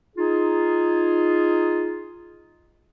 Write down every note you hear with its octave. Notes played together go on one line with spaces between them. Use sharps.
D#4 F4 G#4